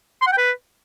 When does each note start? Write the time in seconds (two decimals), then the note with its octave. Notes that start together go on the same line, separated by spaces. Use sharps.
0.21 C6
0.27 F#5
0.32 G5
0.38 B4